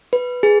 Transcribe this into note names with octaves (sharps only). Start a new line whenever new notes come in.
B4
G#4